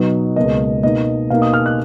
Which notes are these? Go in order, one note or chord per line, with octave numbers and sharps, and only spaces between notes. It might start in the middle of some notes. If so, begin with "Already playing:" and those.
Already playing: B2 F#3 B3 D#4
C#2 B2 A#3 D#5
B2 A#3 D#4 D#5
B2 A#3 D#4 F5
D#6
F6
F#6